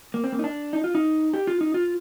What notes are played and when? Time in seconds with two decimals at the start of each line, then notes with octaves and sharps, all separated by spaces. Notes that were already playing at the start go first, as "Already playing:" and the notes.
0.14 A#3
0.24 C4
0.32 A#3
0.39 D#4
0.44 D4
0.73 D#4
0.84 F4
0.95 D#4
1.34 G4
1.47 F4
1.61 D#4
1.74 F4